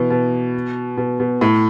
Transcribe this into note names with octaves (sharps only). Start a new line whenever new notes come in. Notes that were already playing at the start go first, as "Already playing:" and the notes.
Already playing: B2 E3
B2
B2
B2
A2